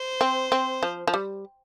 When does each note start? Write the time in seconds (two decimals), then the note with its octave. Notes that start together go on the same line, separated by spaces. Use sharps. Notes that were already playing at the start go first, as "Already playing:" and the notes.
Already playing: C5
0.21 C4
0.52 C4
0.83 F3
1.07 F3
1.14 G3